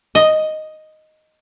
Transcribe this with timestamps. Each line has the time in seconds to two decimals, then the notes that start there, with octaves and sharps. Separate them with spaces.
0.15 D#5